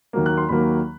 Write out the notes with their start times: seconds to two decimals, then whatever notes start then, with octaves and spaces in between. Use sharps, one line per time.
0.13 D#2 D#3 F#3 A#3
0.26 F#6
0.37 C6
0.49 D#2 D#3 F#3 A#3 B5